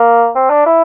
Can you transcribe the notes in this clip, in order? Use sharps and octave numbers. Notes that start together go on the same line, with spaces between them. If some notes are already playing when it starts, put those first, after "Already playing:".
Already playing: A#3
C4
D4
E4